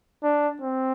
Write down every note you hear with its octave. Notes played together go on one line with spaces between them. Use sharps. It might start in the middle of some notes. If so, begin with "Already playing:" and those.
D4
C4